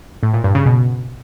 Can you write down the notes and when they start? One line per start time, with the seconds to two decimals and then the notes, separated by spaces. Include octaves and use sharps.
0.23 A2
0.33 A#2
0.44 G2
0.55 C#3
0.66 B2